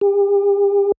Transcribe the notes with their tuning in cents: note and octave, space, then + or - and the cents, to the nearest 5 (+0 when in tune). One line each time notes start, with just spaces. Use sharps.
G4 +40